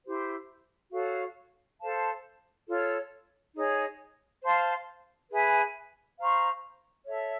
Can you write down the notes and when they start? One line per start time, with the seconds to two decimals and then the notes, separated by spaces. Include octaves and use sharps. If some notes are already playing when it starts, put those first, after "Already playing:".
0.04 E4 G4 C5
0.92 F#4 A4 C#5 F5
1.80 A4 C5 F5 A5
2.67 F4 A4 C#5
3.55 D#4 G#4 C#5
4.43 C5 F5 A5 C6
5.31 G#4 B4 E5 G#5
6.19 C5 F5 A#5 C#6
7.06 A4 C#5 E5